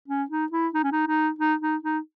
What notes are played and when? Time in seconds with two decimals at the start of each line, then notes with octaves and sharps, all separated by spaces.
0.08 C#4
0.30 D#4
0.52 E4
0.74 D#4
0.83 C#4
0.92 D#4
1.07 D#4
1.39 D#4
1.61 D#4
1.83 D#4